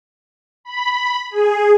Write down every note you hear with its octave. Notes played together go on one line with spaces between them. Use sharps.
B5
G#4